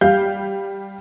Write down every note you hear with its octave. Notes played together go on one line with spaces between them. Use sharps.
G3 F5 G6